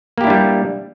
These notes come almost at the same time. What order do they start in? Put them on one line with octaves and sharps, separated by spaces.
A#3 G4 E4 D4 G3